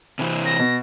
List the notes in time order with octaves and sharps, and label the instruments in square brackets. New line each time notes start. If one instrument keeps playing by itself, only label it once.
[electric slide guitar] C3 E3 C4
[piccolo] A#6
[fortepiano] B2